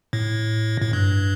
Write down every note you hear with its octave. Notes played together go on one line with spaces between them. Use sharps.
A2
A2
G2